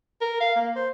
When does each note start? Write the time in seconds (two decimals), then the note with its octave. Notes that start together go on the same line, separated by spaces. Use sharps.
0.21 A#4
0.40 F5
0.56 A#3
0.76 C5